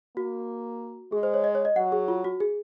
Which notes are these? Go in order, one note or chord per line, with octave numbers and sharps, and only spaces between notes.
A#3 F#4
G#3 G#4
C5
C#5
D#5
C#5
D#5
F#3 F#5
G#4
F4
F#4
G#4